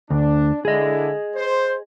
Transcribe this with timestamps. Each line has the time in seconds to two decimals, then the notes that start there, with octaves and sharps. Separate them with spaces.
0.10 D2 D4
0.65 D3 E4 G#4 D#5
1.36 C5